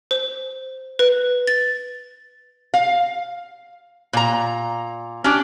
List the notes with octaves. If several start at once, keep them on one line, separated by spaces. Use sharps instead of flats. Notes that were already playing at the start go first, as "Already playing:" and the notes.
C5
B4
A6
F5
A#2 A#5
C#4 D4 G4